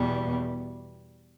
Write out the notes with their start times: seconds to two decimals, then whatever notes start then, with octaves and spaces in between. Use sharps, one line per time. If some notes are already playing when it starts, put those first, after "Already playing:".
Already playing: E2 B2 G3